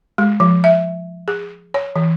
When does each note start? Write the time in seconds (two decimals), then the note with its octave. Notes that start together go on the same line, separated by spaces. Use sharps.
0.18 G#3
0.40 F3
0.64 E5
1.28 G#4
1.74 C#5
1.96 E3